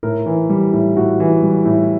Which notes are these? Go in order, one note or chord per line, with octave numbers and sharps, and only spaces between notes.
A2 A#4
E3
G3
A2
A2 F#4
E3
G3
A2